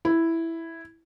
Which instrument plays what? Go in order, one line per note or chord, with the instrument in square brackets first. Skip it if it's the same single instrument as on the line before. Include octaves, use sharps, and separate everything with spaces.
[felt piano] E4